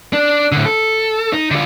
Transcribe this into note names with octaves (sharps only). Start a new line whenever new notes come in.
D4
A2 D3
A4
D#4
D3 F4